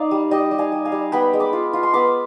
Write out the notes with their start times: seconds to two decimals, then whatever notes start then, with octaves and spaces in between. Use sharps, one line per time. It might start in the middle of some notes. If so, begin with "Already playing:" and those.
Already playing: D#4 D5 F5
0.11 G3
0.31 G3 D#5 G5
0.51 G3
0.58 F5 G#5
0.72 G3
0.85 F5 G#5
0.92 G3
1.12 B3 G5 B5
1.33 G#3
1.40 B5 D6
1.53 F4
1.73 F4
1.83 C6
1.93 B3 B5 D6